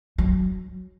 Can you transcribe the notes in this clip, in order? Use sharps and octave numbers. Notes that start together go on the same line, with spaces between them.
F#3